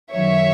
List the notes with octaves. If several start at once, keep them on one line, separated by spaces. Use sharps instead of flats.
F#2 D#3 F#3 C#5 E5